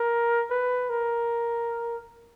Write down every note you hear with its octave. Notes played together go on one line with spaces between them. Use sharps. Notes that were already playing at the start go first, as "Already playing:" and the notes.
Already playing: A#4
B4
A#4